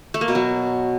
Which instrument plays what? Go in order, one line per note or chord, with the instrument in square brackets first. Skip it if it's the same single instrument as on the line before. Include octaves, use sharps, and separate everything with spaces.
[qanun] A3
A#3
B2
F#3